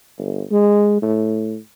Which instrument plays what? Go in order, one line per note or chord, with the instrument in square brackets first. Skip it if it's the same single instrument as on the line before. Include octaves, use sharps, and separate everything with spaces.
[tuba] G1
G#3
A2